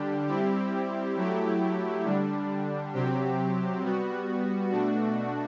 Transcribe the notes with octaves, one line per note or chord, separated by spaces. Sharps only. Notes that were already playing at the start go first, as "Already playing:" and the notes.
Already playing: D3 G3 D4 G4
G3 C4 E4 G4
F#3 A3 E4 G4
D3 G3 D4
C3 F#3 C4 G4
G3 B3 F#4
B2 A3 D4 F#4